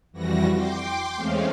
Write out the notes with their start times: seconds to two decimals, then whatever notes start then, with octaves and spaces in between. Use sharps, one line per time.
0.12 F2 E3 G3 F#4 A#6
0.52 G5 C6 D6
1.16 E2 G#3 A3 C4 C#4 F5